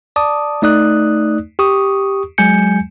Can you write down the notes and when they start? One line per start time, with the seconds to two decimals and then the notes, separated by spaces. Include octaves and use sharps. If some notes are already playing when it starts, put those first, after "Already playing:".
0.16 D5 A5 D6 D#6
0.62 A3 D#4 D5 D#6 F#6
1.59 G4 C#6 D#6
2.38 F#3 G#3 G#5 G6 C#7